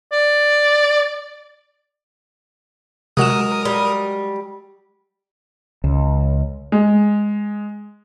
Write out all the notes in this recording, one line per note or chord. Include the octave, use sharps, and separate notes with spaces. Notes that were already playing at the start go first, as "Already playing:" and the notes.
D5
C3 F#3 G#3 A#4 D#6 E7
G3
C#2
G#3